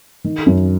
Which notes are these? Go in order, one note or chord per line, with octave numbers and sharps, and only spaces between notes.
D#3
F#2